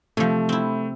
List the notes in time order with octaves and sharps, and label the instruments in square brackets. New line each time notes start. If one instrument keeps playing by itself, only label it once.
[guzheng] C3 F3 [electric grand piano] A3
[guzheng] C4 E4